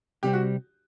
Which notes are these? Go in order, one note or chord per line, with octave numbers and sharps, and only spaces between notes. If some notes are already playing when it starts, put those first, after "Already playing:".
C3 G3 C4 G4
F#4